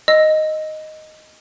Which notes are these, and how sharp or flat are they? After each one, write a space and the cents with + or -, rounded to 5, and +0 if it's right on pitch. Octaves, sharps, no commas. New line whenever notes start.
D#5 +0 E6 +0